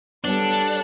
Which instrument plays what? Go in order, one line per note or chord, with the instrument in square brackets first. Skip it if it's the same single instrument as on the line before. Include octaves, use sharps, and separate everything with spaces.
[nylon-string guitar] G3 B3 [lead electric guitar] D4 [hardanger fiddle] A4 C#5